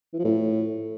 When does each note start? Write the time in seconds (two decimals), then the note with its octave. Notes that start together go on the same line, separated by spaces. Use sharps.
0.13 E3
0.19 F3
0.24 A2